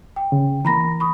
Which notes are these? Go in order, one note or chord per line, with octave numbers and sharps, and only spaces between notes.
G5
C#3
E3 A#3 A#5 B5 A#6
B5 C#6 D#6